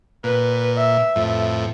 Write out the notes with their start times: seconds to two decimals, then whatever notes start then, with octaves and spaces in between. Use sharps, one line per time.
0.24 A#2 B4
0.77 E5
1.16 F2 A2